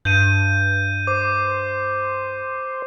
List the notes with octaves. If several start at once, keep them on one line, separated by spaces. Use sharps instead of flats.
G2 G6 D#7
C5 D6